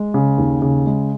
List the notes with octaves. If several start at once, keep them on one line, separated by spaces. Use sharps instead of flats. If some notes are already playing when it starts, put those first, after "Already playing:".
Already playing: G#3
C#3
D#2
C#3
G#3